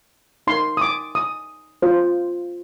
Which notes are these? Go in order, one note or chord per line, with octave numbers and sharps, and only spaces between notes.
D#4 A#4 C6
D#6
D6
D#6
F4 C5